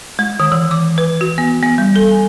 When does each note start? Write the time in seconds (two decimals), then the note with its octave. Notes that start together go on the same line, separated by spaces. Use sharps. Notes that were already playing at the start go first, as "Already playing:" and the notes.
0.19 G#3
0.40 D#3
0.52 E3
0.71 D6
0.98 B4
1.21 F#4
1.38 B3
1.63 B3
1.78 G3
1.96 A4
2.11 G#5